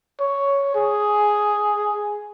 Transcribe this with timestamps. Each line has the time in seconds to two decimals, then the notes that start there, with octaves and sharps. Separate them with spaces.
0.20 C#5
0.75 G#4